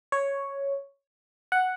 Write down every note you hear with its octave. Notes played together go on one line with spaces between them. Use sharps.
C#5
F#5